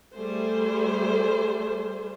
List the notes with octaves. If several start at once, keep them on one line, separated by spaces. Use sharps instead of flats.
G3 A3 G#4 C5